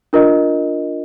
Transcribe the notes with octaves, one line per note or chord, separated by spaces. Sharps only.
D4 F4 A#4 D#5